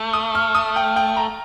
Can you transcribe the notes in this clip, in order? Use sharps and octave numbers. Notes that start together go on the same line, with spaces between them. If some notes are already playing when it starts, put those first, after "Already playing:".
Already playing: A3
D#6
F6
D#6
G5
G5
A#5